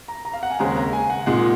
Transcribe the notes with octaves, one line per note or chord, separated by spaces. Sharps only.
A#5
A#5
F5
F#5
G#5
D#2 C#3 G#3 C4 A#5
A#5
G#5
F#5
A#2 G#3 D#4 F#5